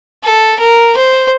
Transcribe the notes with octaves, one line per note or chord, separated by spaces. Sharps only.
A4
A#4
C5